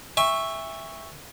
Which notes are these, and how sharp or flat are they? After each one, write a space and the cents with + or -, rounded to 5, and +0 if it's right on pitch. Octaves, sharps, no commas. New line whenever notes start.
E5 +0 G5 +45 C#6 +0